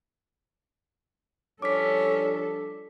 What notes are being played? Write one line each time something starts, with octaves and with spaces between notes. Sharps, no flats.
F3 G3 C#4 D4 A4 D6 B6